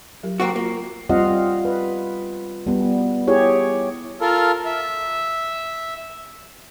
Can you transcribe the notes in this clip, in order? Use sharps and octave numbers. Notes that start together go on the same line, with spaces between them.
F#3 G4 A#4
A#3 C4 F#4
A#3 F4 F#4
G3 C4 F4 D#5 F5 F#5
B4
G3 B3
E4 G4 G#4 C#5
F4 A4 A#4
E5